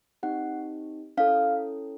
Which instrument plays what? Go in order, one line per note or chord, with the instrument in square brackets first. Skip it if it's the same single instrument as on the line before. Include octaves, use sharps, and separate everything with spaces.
[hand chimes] C4 D#4 G4 F#5
C#4 E4 A4 F5